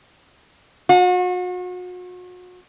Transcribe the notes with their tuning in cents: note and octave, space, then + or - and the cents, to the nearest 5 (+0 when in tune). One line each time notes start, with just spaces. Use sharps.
F#4 -40